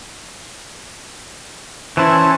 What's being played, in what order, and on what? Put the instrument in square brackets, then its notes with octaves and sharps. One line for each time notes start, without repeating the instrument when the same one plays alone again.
[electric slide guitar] E3 E4 [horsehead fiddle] C#4 [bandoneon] C5 A5